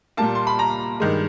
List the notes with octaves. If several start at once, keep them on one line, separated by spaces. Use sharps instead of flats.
A#2 G3 A#3 A5
C6
B5
A#5
G2 D#3 G#3